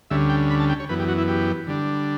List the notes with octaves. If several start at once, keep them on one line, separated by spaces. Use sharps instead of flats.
D2 D3 G3 C#4 E5
G5
B5
A5
G5
C#5
F#2 E3 B3 B4
G4
F#4
E4
G4
D3 G3 D4